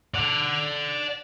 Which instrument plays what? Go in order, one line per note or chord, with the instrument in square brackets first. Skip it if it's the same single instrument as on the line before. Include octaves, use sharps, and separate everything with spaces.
[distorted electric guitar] D5 F#5